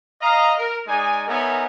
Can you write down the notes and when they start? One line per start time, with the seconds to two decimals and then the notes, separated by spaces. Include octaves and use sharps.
0.21 D#5 F5 A#5
0.58 A#4
0.87 G#3 D#4 D5 G#5
1.28 B3 D#4 A#4 C#5 E5 G#5